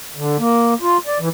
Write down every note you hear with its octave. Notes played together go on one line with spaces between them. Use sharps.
D3
A#3
F4
D5
E3